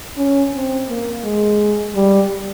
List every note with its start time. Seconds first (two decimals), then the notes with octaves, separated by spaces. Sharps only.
0.17 C#4
0.53 C4
0.89 A#3
1.24 G#3
1.95 G3